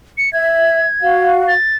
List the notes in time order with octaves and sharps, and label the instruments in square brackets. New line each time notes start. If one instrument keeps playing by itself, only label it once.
[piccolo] C#7
[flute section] E5 [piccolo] G#6
[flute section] F#4 F5
[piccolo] A6